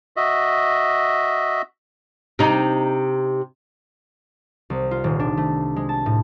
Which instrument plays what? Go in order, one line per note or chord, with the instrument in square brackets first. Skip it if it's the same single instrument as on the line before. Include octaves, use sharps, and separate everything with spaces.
[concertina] F#4 D#5 E5
[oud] C3 D#4
[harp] C2
F4
D#1
D4
A3
G#3
A5
A2